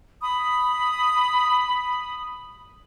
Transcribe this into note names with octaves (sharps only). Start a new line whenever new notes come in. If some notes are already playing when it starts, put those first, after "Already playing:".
B5 D#6